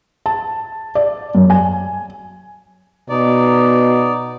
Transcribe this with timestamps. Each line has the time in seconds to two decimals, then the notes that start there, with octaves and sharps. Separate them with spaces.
0.26 A5
0.95 D5
1.35 F#2
1.50 G#5
3.09 B2 D#4 D5